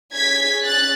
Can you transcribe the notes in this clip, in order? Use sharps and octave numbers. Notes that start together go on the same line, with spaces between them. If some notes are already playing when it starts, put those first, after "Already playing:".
C#4 G#4 G#6 B6
F#6 A6